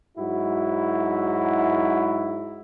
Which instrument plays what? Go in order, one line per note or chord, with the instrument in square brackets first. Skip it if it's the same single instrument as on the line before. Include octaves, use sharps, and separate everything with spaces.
[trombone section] G#2 F#3 E4 F#4